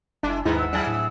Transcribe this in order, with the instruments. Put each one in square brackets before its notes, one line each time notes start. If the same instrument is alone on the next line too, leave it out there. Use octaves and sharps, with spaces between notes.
[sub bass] F#1 [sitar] G3 E4 [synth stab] D4
[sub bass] D#2 [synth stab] G#2 D#4 E4 [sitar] D#3 G#3 B4
[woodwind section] F3 F#5 E6
[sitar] F#3 E4 G#4 [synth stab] D4
[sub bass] A2